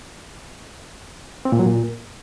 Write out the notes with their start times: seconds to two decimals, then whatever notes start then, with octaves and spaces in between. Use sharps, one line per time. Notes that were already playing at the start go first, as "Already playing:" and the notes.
1.45 C4
1.52 A#2
1.59 F#3
1.66 A#2